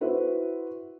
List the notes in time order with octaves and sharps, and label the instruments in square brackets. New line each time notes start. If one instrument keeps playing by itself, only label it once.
[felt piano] E4 F#4 B4 C5 E5